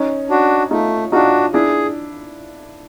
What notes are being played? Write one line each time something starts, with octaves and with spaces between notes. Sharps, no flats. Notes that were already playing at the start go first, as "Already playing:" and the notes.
Already playing: C#4 D#4
D4 F#4
A3 D#4 F4
D4 D#4 F4 F#4
D4 E4 G#4